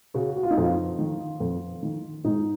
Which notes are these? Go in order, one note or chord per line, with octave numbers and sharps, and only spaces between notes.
C#3 F#4
F#4
F4
D#4
F2 F4
D#3
F2
D#3
G#2 D#4